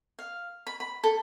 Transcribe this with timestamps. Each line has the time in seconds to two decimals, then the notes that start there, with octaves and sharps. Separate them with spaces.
0.19 F5
0.67 B5
0.80 B5
1.04 A4